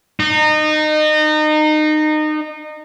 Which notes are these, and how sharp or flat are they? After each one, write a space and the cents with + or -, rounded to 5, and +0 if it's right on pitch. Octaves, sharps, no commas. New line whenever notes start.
D#4 -25